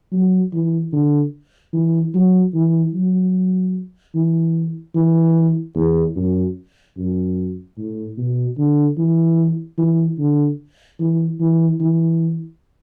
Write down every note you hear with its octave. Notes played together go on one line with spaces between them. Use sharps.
F#3
E3
D3
E3
F#3
E3
F#3
E3
E3
E2
F#2
F#2
A2
B2
D3
E3
E3
D3
E3
E3
E3